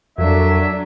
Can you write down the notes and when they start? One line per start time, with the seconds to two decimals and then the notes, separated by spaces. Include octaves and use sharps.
0.18 F2 F#3 D4 F#4 A4 A#4 E5